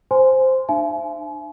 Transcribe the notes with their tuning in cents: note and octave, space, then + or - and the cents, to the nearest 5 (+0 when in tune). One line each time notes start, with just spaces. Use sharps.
C5 +0 G#5 +0 C6 -15
D4 +45 E5 +40 G#5 +40